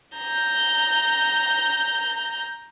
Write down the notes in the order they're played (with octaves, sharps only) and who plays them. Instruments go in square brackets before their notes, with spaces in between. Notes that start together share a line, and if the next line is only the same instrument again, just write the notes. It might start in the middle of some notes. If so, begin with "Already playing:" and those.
[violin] A#5 G6